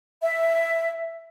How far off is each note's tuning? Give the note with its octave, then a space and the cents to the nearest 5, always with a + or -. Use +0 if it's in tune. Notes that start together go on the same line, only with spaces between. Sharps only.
E5 +5